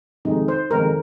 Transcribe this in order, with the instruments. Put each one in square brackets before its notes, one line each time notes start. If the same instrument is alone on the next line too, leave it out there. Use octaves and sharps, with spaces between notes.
[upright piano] F2 C3 D#3 G#3 [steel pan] D#4
[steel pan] C5
[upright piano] F2 C3 D#3 G#3 [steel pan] A#4